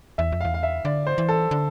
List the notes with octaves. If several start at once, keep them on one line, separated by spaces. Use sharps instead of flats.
E2 E5
F2
E2 F5
F5
E5
D3 D5
C5
E3
A4
D3